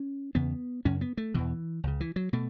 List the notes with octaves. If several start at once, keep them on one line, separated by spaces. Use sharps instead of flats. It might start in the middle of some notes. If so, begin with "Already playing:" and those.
Already playing: C#4
E2 C#3 B3
F#2 C#3 C#4
B3
A3
E2 B2 E3
C#2 C#3
E3
F#3
B2 A3